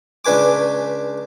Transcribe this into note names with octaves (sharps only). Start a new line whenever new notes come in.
C#2 D4 B4 G#5 D6